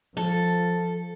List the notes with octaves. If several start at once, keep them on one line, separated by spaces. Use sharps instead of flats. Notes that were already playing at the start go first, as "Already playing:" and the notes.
F3 A4